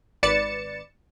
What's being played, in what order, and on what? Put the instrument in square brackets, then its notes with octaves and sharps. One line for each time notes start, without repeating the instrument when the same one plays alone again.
[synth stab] G#1 B4 D5 A6 C#7 E7